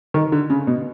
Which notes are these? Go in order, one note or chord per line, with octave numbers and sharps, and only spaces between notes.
D#3
D3
C#3
B2